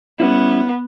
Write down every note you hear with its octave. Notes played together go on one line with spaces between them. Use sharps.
G3 B3 C#4 E4